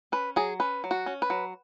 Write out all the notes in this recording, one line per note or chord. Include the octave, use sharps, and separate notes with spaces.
C#4 B4
F#3 G#4
C#4 B4
F#3
F#4
C#4
B4
F#3